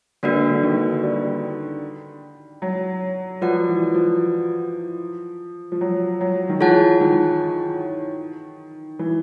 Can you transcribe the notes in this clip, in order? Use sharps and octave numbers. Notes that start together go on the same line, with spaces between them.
D3 A#3 D4 F#4 B4
D3
D#3
G3
F#3
F3 F#4 B4 D5 F#5
E3
F3
F3
F#3
F#3
D#3
E3 F4 G#4 C#5 F#5 A5
D#3
E3